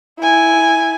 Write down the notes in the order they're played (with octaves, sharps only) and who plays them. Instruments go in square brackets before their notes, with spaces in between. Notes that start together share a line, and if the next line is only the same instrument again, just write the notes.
[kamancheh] E4 G#5